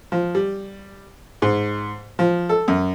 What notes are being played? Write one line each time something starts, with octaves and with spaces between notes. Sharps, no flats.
F3
G3
G#2
F3
A4
F#2